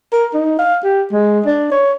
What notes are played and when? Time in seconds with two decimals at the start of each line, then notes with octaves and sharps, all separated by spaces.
0.13 A#4
0.34 D#4
0.59 F5
0.84 G4
1.12 G#3
1.46 D4
1.71 C#5